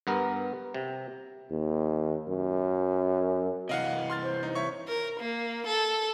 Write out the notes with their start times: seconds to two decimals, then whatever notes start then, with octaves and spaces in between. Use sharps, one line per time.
0.07 G2 B3 A#4
0.74 C3
1.51 D#2
2.28 F#2
3.69 C3 E3 D#5 F5 F#5
4.10 C6 F6 A6
4.23 C5
4.43 D#4
4.55 C#5 E5 C#6
4.88 A#4
5.19 A#3
5.66 A4